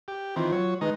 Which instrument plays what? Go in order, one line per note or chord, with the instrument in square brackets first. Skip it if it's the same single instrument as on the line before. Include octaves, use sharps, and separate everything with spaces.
[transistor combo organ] G4
[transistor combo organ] D#3 E3 C4 [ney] F4
[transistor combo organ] F#3 C#5
[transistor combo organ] D#3 G#3 D#4 [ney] B4